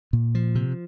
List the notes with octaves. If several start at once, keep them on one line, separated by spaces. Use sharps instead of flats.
A#2
F3
C3